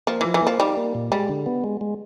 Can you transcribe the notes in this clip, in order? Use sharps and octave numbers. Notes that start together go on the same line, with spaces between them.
F3 A#3
E3 F3
E3
F3 A#3
G3 D#4
A#3
A#2
G3 G#3
D3
B3
G#3
G#3